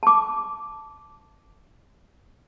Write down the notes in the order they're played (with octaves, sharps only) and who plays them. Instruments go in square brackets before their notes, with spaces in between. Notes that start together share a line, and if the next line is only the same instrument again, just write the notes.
[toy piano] A5 D6